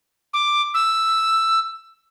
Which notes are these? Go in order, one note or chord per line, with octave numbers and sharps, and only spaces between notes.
D6
E6